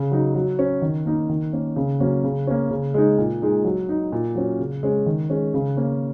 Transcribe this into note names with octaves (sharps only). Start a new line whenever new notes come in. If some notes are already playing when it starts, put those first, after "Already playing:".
Already playing: C#3
F#3 D#4
F#3
C#4
D#3
A#3 D#4
D#3
A#3 C#4
C#3
F#3 A#3 C#4
C#3
A#3 C#4
C#3
G#3 D#4
A#2
G#3 D#4
F#3
D#4
A#2
F#3 C#4
C#3
G#3 C#4
D#3
G#3 C#4
C#3
A#3 C#4